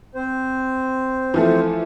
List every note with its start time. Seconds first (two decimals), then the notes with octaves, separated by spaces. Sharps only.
0.15 C4 C5
1.34 E3 F3 A3